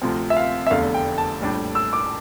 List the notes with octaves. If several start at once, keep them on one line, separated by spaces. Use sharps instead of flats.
D2 C3 F3 C4
E5
F5
E5
F1 E2 D3 A3 F5
G5
A5
A#1 A2 G3 D4
E6
D6